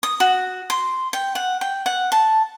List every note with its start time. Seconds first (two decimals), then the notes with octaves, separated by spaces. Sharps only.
0.03 D#6
0.20 F#4
0.70 C6
1.13 G5
1.35 F#5
1.61 G5
1.86 F#5
2.12 A5